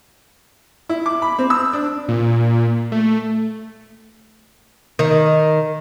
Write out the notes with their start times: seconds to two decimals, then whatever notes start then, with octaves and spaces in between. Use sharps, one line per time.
0.89 E4
1.06 D6
1.22 B5
1.39 C4
1.50 E6
1.73 D4
2.08 A#2
2.92 A3
4.99 D#3